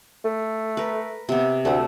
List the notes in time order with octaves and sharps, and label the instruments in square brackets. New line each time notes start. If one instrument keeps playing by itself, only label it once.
[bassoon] A3
[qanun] A#4 B4
C3 B3
[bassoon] D2 [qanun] A3 F#5